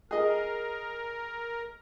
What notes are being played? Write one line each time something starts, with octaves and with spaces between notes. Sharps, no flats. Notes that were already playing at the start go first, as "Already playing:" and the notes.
G#4 A#4 D#5